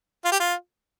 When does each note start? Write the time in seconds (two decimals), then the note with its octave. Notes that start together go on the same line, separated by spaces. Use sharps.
0.25 F4
0.32 G4
0.40 F4